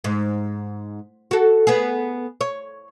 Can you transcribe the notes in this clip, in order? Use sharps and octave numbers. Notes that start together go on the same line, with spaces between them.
G#2
F#4 A4
B3 G#4
C#5